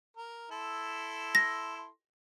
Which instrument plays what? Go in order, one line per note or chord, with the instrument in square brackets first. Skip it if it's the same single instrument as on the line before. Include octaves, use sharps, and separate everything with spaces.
[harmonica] A#4
E4 A4 C6
[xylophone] A#6